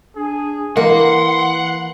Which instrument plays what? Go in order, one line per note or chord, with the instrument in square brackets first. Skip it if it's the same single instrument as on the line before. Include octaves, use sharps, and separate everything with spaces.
[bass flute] D4 [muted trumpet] G#4
[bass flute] E3 [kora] A#3 [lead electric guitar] F#5 [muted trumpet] C6